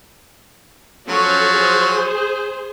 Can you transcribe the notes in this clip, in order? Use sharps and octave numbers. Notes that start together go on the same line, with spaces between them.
F3 F#3 C#4 A4 C#5
G#4 C5